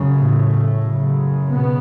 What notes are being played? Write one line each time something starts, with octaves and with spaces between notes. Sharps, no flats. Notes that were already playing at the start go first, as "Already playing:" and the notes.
Already playing: F#2 C#3
A2 A3
F#2 C#3
B2 B3